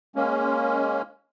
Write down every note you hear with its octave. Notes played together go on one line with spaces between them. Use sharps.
G#3 A#3 C#4